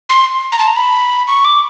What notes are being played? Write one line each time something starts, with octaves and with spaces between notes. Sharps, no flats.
C6
A#5
A5
A#5
B5
C#6
D6